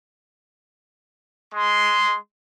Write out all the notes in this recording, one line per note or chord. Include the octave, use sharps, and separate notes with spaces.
G#3 C6